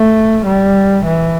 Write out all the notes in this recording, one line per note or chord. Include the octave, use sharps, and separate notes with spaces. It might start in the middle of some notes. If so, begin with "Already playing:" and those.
Already playing: A3
G3
E3